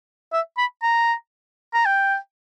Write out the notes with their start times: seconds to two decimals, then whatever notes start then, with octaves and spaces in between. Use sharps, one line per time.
0.33 E5
0.58 B5
0.83 A#5
1.74 A#5
1.86 G5